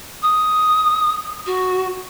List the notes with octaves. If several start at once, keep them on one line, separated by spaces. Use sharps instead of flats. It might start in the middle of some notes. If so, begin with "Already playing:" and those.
D#6
F#4